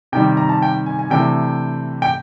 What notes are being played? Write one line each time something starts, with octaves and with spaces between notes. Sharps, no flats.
C3 D#3 G3 G5
A#5
A5
G5
G#5
G#5
C3 E3 A3 D4 G5
G5